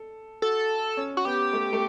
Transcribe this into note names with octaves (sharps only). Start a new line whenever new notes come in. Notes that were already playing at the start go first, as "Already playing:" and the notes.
Already playing: A4
F#4 A4
C#4
F#4
B3 G4
A3
A3